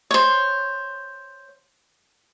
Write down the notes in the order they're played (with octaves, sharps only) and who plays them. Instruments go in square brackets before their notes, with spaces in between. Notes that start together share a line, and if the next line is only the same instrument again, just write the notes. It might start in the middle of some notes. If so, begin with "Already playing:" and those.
[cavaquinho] C5 C#5